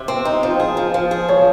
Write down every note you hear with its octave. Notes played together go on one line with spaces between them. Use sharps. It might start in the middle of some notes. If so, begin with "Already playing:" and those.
Already playing: C3
C4
D#4
F3
G#4
F3
F3
G#4
F3 C#5